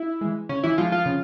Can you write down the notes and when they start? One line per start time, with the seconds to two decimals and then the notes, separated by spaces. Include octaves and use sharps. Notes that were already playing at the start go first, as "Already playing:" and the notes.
Already playing: E4
0.21 E3 G#3
0.49 C#3 C#4
0.63 E3 E4
0.78 E3 F3 G#3 F4
0.92 F3 F4
1.06 C#3